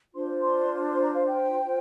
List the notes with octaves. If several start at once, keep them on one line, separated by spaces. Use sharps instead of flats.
D4 F4 C5 C6
C6
C6
A#5
F5
G5
F4 C5